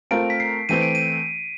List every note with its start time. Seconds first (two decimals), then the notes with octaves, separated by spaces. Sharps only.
0.11 A3 C4 F4 A#4 D7
0.30 B6
0.40 C7
0.69 E3 A3 C4 E4 D#7
0.82 D7
0.95 D#7